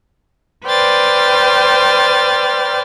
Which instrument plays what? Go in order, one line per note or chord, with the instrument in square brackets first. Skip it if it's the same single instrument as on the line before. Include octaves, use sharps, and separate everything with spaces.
[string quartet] B4 C5 D5 G5 F6 A6